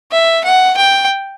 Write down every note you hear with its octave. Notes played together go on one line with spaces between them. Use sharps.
E5
F#5
G5